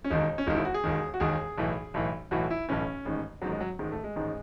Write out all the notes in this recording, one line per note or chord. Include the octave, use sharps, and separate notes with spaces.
C#4
E1 D#2 D#3 D#4
C#4
E1 D#2 D#3 D#4
E4
F#4
G#4
E1 D#2 D#3
F#4
E1 D#2 D#3 G#4
B1 A2 E3
B1 A2 E3
B1 A2 E3 F#4
E4
B1 A2 E3 C#4
A1 G#2 D#3
A1 G#2 D#3 F#3
G#3
F#3
A1 G#2 D#3 G#3
A3
G#3
A1 G#2 D#3